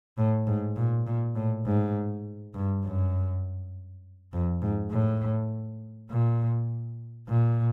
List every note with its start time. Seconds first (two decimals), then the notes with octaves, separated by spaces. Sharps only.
0.18 A2
0.47 G#2
0.77 A#2
1.06 A#2
1.36 A2
1.66 G#2
2.55 G2
2.84 F#2
4.33 F2
4.62 G#2
4.91 A2
6.11 A#2
7.29 A#2